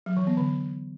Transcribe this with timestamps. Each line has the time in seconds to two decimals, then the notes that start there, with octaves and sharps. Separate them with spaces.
0.06 F#3
0.17 E3
0.27 B3
0.37 D3